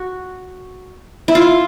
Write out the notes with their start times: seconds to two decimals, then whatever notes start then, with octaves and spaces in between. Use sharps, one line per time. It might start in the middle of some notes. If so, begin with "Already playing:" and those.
Already playing: F#4
1.28 E4
1.35 F4